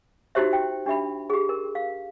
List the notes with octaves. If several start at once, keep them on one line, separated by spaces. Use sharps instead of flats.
D#4 E4 F#4 G4 C5 E5
G5
D4 G4 E5 B5
G4 G#4
A#4
F5